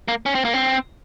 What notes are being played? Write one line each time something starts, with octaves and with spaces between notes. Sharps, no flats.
A#3
C#4
C4
A#3
C4